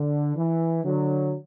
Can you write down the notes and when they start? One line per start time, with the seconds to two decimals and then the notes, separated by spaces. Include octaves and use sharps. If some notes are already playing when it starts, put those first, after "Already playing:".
Already playing: D3
0.36 E3
0.84 D3 F#3